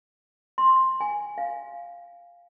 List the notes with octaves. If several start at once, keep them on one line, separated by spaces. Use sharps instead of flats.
C6
G#5
F5